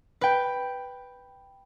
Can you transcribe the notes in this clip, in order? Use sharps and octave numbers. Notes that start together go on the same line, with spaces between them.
B4 G5